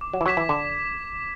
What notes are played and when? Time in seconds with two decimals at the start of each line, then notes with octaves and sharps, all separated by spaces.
0.01 D6
0.13 F#3
0.21 E3
0.25 F#3 G#6 B6 E7
0.37 E3
0.49 D3 D6